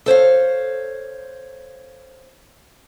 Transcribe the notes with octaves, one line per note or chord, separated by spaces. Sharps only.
A4 C5 C#5 F5